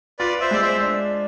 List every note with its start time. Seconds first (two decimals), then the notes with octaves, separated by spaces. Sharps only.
0.19 F4 B4 D5
0.41 C5 E5
0.51 G#3 D5
0.62 C5 E5
0.82 D4